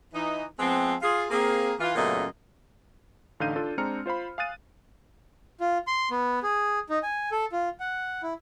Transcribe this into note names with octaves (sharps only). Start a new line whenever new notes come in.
E3 D#4
F3 G#3 B3 C4
F4 G#4
A#3 C4 G#4
E3 F4
F#2 A#2 C#3 A3 B3 D#5
A1 D3 D#4 F5 G6 D#7
D4 F4 A4
G#3 C4 D4 A#5 F6 C#7
F4 C5 F5 B5
F5 G#5 D#6 F#6 A6 D#7
F4
C6
B3
G#4
D#4
G#5
A4
F4
F#5
E4